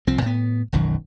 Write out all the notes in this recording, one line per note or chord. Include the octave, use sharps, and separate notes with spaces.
C2 F3 C4
A2 B3
E1 B1 F#2 D#3